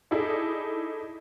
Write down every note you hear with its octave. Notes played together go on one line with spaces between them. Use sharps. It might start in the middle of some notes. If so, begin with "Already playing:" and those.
D#4 E4 G#4 A4 D5